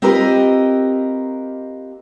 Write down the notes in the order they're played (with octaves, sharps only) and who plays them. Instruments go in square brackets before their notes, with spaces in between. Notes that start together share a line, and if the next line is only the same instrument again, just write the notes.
[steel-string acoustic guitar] C4 F4 G4 A#4 B4 D#5